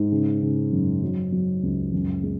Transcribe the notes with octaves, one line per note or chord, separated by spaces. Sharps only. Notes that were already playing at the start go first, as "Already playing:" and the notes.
Already playing: G#2
C#3
C#3
F#2
F#3
F#3
C#2
F#2
G#3